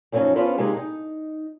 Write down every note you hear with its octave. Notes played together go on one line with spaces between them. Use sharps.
F#2 F3 F#3 C4 C#4 D#4
B3 C#4 D4 F4 B4 C5
C3 G#3 A#3 D#4 G4 G#4
D#4